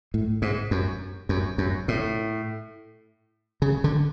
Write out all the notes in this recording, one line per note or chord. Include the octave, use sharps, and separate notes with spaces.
A2
G#2
F#2
F#2
F#2
A2
C#3
D3